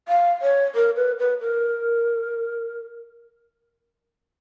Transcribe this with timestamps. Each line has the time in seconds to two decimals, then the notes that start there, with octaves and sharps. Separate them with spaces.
0.08 F5
0.42 C#5
0.75 A#4
0.96 B4
1.19 B4
1.41 A#4